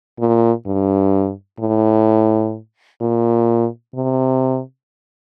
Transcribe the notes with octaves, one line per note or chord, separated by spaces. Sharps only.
A#2
G2
A2
A#2
C3